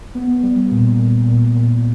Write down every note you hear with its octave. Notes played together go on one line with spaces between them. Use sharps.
B3
G3
A#2
A#2
A#2
A#2